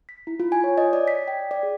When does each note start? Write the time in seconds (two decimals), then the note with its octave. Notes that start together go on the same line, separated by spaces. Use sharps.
0.09 B6
0.27 E4
0.40 F4
0.52 G#5
0.64 C#5
0.78 D#5
0.93 D5
1.08 B6
1.28 G5
1.51 D5
1.63 G#4